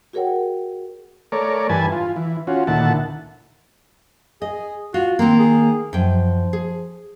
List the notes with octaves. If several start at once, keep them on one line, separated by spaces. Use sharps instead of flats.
F#4 G#4 A#4 C#5 F#5 G5
A3 A#4 C#5 D5
G2 E3 B4 G#5 A5
F4
E3
C#4 F4 F#4
D2 A#2 D#3 E4 F#5 A5
G#4 D#5
F4 F#4
D#3 A#3 C4
G#4
F#2 F3 G5
G#4